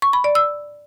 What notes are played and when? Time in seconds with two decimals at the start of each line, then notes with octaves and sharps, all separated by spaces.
0.02 C#6
0.13 B5
0.24 D5
0.35 E6